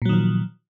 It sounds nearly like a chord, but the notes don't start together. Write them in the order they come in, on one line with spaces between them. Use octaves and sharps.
A#2 F#3 D#3 F3